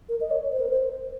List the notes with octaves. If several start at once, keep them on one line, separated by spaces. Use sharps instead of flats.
A#4
D#5
C#5
C5
A#4
C5